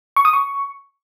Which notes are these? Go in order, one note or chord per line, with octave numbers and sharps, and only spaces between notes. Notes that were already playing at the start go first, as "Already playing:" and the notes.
C#6
D#6
C#6